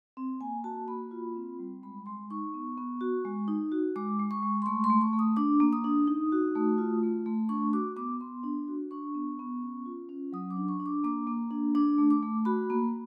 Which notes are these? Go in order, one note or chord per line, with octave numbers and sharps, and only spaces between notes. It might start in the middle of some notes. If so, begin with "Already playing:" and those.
C4
A#3 G#5
F#4 A5
A#3 B5
F4
C4
G3
G#3 B5
G#3 C6
D#4 C#6
B3
B3
F#4
G#3
D#4
F#4
G#3 D6
G#3
C#6
G#3
C6
A3 C#6
C6
A3
C#6
A3
D#6
D4 D6
A#3
D#6
D4
D#4
F#4
A3
F4
A3
A3
D4 C#6
F#4 D6
B3 D6
B3 C6
D4
F#4
D4 C#6
B3
B3
C#4
F4
C#4
F#3 D#6
D6
D4
C#6
D4
D6
A#3 D6
A#3
D4
D4 D6
A3
D6
A3
F#4 B5
A#3